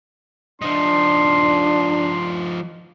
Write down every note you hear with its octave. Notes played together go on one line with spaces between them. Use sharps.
F3 D4 D#4 C6